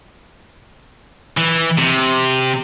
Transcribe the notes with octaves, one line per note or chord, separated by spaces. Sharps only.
E3
C3